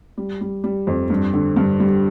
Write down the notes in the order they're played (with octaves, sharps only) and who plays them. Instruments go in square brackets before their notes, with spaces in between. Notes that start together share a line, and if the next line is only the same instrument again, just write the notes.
[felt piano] G3
G3
G3
F2
G2
D3
G2
G3